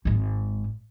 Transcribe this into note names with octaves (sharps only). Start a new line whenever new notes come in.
G#1 G#3